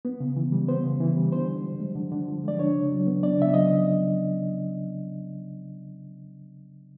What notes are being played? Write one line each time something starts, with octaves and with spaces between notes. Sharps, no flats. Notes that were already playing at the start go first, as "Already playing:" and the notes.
B3
C#3
E3
G3
B3 C5
C#3
E3
G3
D3 C5
D3
F3
G#3
D3
D3
F3
G#3 D5
D4 C#5
C#3
F#3
B3
D4 D5
C#3 E5
F#3 D#5